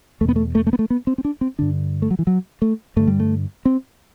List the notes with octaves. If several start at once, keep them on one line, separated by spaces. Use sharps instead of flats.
E2 B2 A3 B3
A3
A3
A3
B3
A3
B3
C4
C4
D4
C4
G2 D3 D4
A3
F#3
E3
F#3
A3
G2 D3 A3
G3
A3
C4